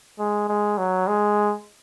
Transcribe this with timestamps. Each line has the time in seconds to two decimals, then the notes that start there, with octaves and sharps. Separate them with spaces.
0.19 G#3
0.49 G#3
0.78 F#3
1.08 G#3